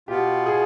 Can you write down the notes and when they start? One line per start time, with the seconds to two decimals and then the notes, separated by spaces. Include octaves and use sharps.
0.08 B2 B3 F4 G4
0.46 G#4